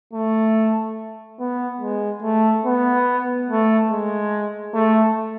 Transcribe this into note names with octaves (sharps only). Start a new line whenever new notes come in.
A3
B3
G#3
A3
B3
A3
G#3
A3